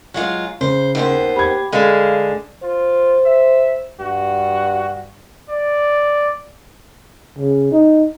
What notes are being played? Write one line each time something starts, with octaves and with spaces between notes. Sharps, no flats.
F#3 G#3 F4
C#3 C5
D#2 B3 C5
G4 B5 G#6
D3 G#3 F5
F4 C5
E5
G2 F#4
D5
C#3
D#4